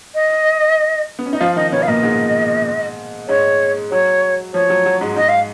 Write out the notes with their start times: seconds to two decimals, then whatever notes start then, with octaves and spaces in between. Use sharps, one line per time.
0.15 D#5
1.19 B3
1.26 C#4
1.33 D#4
1.36 D#5
1.40 F3 F4 F5
1.56 D#3 D#4 D#5
1.72 B2 B3 C#5
1.82 F5
1.88 A#2 A#3 D#5
2.03 G#2 G#3
3.28 G#2 G#3 C#5
3.91 F#3 C#5
4.54 F3 C#5
4.70 F#3
4.86 F#3
5.01 G#2 G#3
5.16 G#2 G#3 D#5
5.29 F5